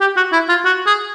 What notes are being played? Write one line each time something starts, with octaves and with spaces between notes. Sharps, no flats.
G4
F#4
E4
F4
F#4
G#4